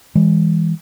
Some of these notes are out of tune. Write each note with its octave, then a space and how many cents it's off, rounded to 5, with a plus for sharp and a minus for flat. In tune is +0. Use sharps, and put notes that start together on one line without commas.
E3 -10 G#3 -25